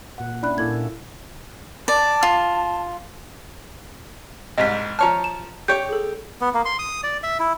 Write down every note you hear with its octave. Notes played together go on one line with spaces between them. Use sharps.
A#2 F#5
C#4 D4 E4 D5 B5 F#6
A#2 A#3 E4 A4 G#6
D5 A5
F4
C2 G#2 D#5 B6
F3 C#5 A5 A#5 F6
E7
G4 C#5 G6
G#4 A4
B3
A#3
C6
D#6
D5
E5
E4